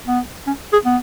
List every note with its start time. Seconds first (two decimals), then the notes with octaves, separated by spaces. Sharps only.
0.08 B3
0.47 C#4
0.73 G#4
0.85 B3